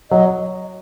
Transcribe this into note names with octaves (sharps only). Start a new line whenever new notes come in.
F#3 D#5